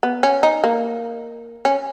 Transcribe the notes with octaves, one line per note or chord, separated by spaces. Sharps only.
B3
C#4
D#4
A#3
C#4